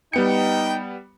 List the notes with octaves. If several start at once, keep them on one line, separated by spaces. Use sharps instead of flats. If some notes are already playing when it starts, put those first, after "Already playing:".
G3 B3 D#4 G5 C#7